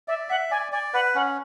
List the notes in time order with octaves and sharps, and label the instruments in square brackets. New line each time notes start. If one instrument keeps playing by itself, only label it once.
[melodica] D5 [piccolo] E5
[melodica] E5 [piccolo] F#5
[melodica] D5 [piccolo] G#5
[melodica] D5 [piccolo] G#5
[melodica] B4 [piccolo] F#5
[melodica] C#4 [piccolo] F#5